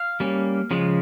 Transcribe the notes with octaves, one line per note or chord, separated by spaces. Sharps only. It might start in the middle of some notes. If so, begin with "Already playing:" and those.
Already playing: F5
G3 A#3 C#4
C#3 F3 G#3